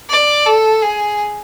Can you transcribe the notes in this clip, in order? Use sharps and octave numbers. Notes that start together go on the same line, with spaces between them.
D5
A4
G#4